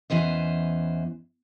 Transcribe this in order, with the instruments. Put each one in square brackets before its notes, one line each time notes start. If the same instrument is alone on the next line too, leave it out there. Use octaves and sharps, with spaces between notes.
[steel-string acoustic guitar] E2 E3 C#4 C5 D#5